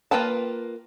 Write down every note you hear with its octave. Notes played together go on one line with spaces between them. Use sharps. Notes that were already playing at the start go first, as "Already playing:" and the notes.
A#3 F4 B4 G5 A5